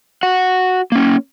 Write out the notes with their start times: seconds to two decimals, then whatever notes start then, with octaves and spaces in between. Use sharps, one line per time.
0.23 F#4 F#5
0.92 A#3 C#4